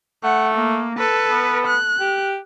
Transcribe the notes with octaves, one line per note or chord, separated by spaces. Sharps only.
A3 F#5
A#3
A4 B4
B3
F#6
G4